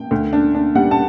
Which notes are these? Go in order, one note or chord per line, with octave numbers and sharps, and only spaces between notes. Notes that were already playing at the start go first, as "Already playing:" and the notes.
Already playing: G5
D2
D4
D4
G3 F#5
A5